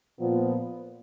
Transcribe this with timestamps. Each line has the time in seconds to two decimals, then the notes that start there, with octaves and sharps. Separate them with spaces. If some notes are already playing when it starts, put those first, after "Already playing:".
0.18 A#2 F3 B3